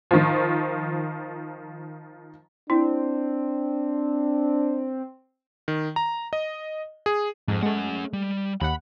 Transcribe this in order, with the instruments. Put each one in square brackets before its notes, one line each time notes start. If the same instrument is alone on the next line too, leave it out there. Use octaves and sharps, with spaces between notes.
[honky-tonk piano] D#3 F3
[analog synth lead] C4 [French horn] D4 [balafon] E4
[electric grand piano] D#3
A#5
D#5
G#4
[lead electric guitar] F2 [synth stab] G#2
[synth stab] G#3 A3 [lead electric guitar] C#4 F#5
[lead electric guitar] G3
[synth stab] D#2 F#5 [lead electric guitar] B5